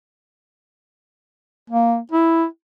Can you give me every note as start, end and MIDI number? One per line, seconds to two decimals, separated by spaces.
1.70 1.98 58
2.11 2.45 64